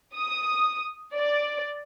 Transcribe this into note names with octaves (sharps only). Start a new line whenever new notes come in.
D#6
D5